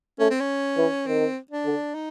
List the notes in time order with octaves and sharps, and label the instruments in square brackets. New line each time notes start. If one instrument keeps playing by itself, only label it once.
[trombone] A3 [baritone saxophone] C#4
[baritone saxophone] C4
C#4
[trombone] E3
[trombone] D#3 [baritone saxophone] C4
[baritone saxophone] D4
[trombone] D3
[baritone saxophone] D#4